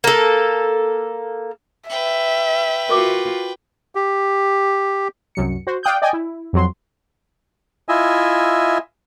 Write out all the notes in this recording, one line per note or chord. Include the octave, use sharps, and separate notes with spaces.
A#3 A4
B4 E5 G5
F4 F#4 A#4 C#6 D6
G4
C2 F#2 C#7
F#4 C5
D5 F5 G5 D#6 F#6 G6
D5 D#5 G5 G#5
E4
F2 F#3 C6
E4 F4 D#5 E5 G#5